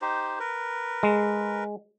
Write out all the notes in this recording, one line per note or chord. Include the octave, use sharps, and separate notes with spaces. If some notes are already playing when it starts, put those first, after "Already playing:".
D#4 G4 C5
A#4 B4
G#3